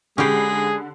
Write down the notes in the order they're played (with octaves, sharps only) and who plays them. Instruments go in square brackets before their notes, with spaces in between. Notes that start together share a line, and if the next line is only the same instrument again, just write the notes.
[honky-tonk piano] D3 B5 C7 [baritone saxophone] G#3 [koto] C#4 G4 [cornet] G#4